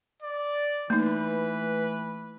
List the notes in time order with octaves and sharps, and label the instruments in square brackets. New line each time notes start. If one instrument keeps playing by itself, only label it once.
[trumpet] D5
[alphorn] E3 [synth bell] A3 [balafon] A#3 D#4 [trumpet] B4